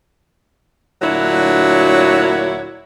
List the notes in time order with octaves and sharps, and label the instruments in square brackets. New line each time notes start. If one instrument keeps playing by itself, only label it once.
[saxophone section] D2 A#2 F#3 D4 E4 C#5